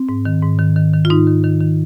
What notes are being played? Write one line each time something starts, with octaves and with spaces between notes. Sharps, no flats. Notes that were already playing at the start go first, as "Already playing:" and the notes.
Already playing: C4
G#2
D#3
G#2
D#3
D#3
D#3
F4
G#2 D#4
D#3
D#3
D#3